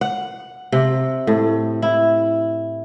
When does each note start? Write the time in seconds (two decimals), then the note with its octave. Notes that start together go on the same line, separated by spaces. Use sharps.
0.01 F#5
0.72 C3
1.27 A2
1.82 E4